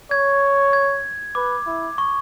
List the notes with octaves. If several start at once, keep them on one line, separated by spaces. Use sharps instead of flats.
C#5 G#6
G#6
B4 D6
E4
C#6